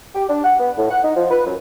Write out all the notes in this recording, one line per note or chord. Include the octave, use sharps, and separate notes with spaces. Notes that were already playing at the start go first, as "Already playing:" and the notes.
G4
D4
F#5
B3
A2
F#5
D#4
F3
B4
F#2